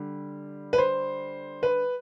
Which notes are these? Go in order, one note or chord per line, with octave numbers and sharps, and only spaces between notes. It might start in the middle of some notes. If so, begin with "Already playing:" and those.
Already playing: D3 G3
B4
C5
B4